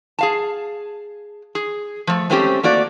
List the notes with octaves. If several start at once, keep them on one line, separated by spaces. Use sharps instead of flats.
G#4 F5 A5
G#4
F3 A3
G#3 A3 C4 C#4 D#4 G4
A3 A#3 F#4 D5